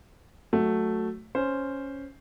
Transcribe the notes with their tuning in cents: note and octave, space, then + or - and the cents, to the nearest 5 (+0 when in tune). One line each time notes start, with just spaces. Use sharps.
F#3 +0 A3 +0
C#4 +0 C5 +0